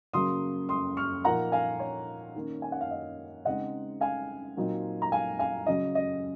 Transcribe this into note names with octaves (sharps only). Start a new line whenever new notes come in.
C#3 F#3 A#3 C6 D#6
C6 D#6
C#6 F6
A#2 F3 A#3 D#4 F#5 A#5
F5 G#5
C#5
D#3 A#3 C#4
G#5
F#5
F5
D#5
C#3 G#3 C4 D#4 D#5 F#5
F5 G#5
A#2 F#3 C4 D#4
A#5
F5 G#5
F5 G#5
C#3 F#3 C#4 D#5
D#5